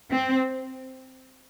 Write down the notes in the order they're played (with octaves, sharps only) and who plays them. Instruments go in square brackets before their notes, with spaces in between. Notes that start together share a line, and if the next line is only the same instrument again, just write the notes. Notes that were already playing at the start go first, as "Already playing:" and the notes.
[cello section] C4